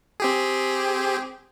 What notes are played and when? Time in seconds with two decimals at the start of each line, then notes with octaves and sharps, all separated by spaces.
0.20 C4 G4 G#4